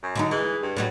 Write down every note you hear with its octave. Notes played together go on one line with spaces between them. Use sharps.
F#2
D3 F#3 D#4
E3 G#3
G2
A2 F#3 G3